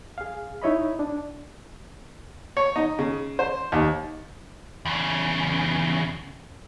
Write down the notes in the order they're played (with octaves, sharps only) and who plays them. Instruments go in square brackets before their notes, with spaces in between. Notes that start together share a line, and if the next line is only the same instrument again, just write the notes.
[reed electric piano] G#4 F5
D#4 E4 C#5 D#5 B5
D4
[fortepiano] C#5
D#4
C#3
C5
D#2
[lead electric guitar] E2 C#3